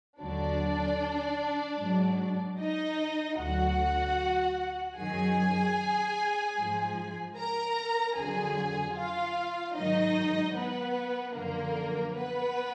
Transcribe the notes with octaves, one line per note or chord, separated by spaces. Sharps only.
D#2 D3 F#3 D4 D5
G#2 F#3
D#4 D#5
D2 D3 F#3 F#4 F#5
F#2 D#3 F#3 G#4 G#5
G#2 F3
A#4 A#5
F2 D3 F#3 G#4 G#5
F4 F5
G#2 D#3 F#3 D#4 D#5
B3 B4
F#2 D3 F3 A#3 A#4
B3 B4